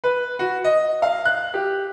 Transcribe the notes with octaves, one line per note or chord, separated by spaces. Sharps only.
B4
F#4
D#5
F5
F#6
G4